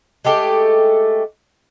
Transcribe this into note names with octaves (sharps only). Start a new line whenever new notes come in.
G#3 A3 G4 A4